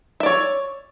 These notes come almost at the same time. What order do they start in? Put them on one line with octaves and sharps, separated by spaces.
E5 D5 C#5